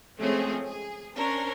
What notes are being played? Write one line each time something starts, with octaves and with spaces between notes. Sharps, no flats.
F3 G#3 A3 C4 C#4 G#4
G#4
C#4 D4 A#4 C5